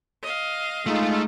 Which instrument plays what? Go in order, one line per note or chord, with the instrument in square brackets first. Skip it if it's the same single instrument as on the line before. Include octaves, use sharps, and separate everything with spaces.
[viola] D#5 F5
[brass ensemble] G#3 D#4 F4 [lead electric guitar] A3